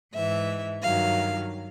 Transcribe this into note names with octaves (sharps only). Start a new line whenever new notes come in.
G#2 E3 E5
G2 D#3 F#3 F5